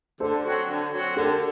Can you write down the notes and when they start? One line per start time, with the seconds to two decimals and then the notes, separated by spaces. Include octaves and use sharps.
0.20 D3 A4 C5
0.45 F#3 C4 F#4
0.69 D3
0.93 F#3 C4 F#4
1.16 D3 G4 A#4